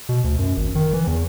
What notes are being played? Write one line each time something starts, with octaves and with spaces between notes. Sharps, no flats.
B2
D2
F#2
G#1
D#3
E3
E2